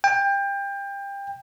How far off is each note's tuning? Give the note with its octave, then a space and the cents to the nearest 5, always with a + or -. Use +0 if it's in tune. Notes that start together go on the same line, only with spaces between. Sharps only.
G5 +25